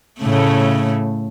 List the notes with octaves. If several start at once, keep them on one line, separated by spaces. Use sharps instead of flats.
A2 C#3 A3